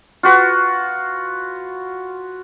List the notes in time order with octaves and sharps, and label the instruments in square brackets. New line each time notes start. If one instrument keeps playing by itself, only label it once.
[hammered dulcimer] F4 F#4 B4